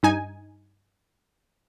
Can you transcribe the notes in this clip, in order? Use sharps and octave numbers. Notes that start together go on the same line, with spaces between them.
G2 D#4 G#5